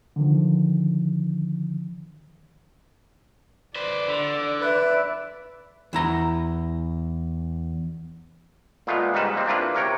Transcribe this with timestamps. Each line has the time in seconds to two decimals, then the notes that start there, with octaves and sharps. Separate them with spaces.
0.16 D3 D#3 F3
3.76 B4 C5 D5
4.08 D3
4.61 B4 D5 E5
5.93 E2 E4 A#5
8.87 A#2 G#3 A3 B3 F4
9.14 G#2 G3 D#4 B4 A5
9.33 G#3 A#3 C4
9.46 A#3 C4 D4 E4 F4 B4
9.75 C3 A#4 C#5 G5